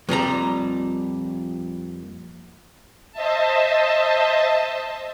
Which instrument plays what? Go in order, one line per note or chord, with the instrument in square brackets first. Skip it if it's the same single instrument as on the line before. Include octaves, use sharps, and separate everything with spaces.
[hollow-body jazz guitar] F2 A#2 G3 A#5
[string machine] C5 D#5 E5 A5